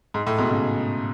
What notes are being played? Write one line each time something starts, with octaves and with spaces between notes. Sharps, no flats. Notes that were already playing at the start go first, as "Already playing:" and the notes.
G#2
A2
G#2 B2
A2 C#3